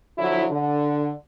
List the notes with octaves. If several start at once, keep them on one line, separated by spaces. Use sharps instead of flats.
D3 F3 F#3 E4
D3